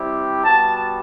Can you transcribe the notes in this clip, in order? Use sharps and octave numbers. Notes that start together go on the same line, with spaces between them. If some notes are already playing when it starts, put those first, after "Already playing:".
Already playing: G3 C4 E4 G4
G3 B3 F#4 A5